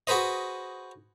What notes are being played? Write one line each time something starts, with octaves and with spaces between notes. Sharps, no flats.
F#4 G#4 B4 C5 D#5